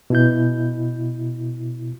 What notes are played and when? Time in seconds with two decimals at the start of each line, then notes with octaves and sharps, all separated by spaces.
0.10 B2 E4 G6